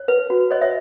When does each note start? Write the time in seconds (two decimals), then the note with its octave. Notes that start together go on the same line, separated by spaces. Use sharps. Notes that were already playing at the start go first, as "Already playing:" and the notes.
Already playing: C#5
0.08 B4
0.30 F#4
0.51 C#5 D#5
0.61 C#5 E5